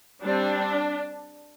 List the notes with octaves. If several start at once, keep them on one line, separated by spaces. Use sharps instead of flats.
G3 C4 D4